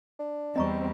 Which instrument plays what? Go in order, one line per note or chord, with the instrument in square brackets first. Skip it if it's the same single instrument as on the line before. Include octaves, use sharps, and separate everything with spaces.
[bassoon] D4
[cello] E2 G3 [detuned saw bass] C4 [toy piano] D#5 A#5 C#6